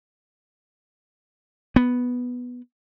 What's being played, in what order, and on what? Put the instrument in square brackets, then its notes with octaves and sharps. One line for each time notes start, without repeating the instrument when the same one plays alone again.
[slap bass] B3